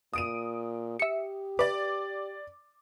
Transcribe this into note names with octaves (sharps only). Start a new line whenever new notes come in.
A#2 D#6 D7 D#7
G4 E5 C#7
B4 D5 D6